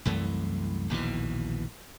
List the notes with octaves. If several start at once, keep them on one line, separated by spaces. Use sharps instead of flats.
C2 F#2 E3 A3
A#1 D#2 B2 E3